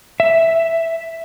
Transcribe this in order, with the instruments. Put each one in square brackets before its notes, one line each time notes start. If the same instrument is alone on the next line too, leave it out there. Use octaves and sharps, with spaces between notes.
[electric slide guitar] E5